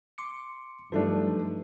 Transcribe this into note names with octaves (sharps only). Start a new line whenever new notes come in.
C6 D6 C#7
G2 F3 F#3 A3 D4 D#4 B4